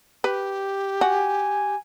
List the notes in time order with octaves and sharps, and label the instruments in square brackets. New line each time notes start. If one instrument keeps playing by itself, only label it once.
[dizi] G4 [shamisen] B4
[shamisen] F#4 [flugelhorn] G#5